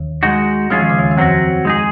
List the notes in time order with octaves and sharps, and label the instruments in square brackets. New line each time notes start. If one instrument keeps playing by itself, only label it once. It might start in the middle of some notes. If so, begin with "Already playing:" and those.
Already playing: [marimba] D#2 D#3
[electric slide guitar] G#3 D#4 F#4
[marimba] F3 [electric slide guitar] G#3 C#4 F4 G#4
[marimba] D#3
C#3
D#2 D#3
D#3
[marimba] F2 F3 [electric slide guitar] F#3 C4 F#4
[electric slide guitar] G#3 D#4 G#4